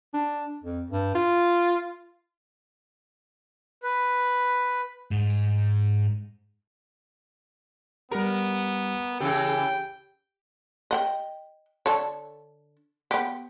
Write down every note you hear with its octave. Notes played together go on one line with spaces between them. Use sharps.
D4
F2
G2
F4
B4
G#2
G3 B3 G4 A#4
C#3 E3 G4 G5
D#5 F#5 G5
D3 A4 C#5
B3 G4